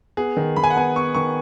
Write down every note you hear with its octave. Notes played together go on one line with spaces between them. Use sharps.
B3 G#4
D#3
D#3 B5
G#5
F#5
B3 G#5
B3 C#6
D#3 C#6